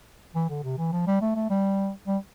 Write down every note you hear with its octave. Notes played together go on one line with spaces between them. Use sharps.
E3
D3
C3
E3
F3
G3
A3
A3
G3
G3